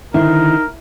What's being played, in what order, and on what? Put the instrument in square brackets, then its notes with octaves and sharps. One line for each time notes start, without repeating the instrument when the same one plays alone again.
[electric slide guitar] D3 D#3 C5 [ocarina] D#4 [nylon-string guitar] E4 [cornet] A#4